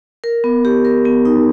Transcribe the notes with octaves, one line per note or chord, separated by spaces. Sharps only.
A#4
B3
G4
A#4
B3
D#4